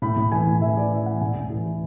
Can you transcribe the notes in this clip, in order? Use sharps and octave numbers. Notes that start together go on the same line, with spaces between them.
A2 B5
A2
E3 G#5
A2
E3 E5
E3 D5
E3 D5
E3 F#5
A2 G#5
A2
E3
E3